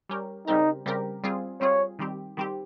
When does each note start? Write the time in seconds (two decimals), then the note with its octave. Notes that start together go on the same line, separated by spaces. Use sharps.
0.09 G3 C#4 G4 A#4
0.48 C#3 G3 C4 D#4 G4 A#4
0.86 C#3 G3 C4 G4 A#4
1.24 G3 C4 F4 G#4
1.61 G3 C4 F4 G#4 C#5
1.99 D#3 G3 C4 G4
2.37 D#3 G3 C4 G4